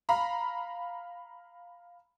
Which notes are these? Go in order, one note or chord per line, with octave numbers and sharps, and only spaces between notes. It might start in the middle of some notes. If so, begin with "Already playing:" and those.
F5 A#5 B5